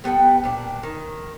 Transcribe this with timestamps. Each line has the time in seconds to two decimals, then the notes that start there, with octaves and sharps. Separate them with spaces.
0.04 G3 B3 A4 G5
0.44 A#2 D4
0.83 D#3